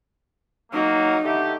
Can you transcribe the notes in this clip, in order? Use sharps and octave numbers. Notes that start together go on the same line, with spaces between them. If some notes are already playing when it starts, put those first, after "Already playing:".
F#3 A#3 D#4
D3 A3 G4